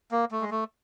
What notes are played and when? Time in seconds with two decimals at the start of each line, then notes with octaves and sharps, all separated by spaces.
0.12 A#3
0.31 A3
0.41 G#3
0.51 A3